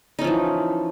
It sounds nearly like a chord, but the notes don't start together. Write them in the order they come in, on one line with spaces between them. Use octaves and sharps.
D#4 C#4 F3 E3